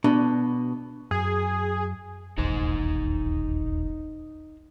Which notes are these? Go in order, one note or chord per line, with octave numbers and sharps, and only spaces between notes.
B2 D4
F#2 G#4
E1 A#1 D#2 D#4 C5